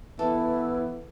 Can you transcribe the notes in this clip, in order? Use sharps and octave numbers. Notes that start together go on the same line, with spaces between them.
E3 B3 E4 A4